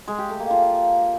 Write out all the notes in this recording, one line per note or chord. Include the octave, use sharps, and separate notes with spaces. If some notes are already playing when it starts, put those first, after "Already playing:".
G#3
G4
A3
A#3
F4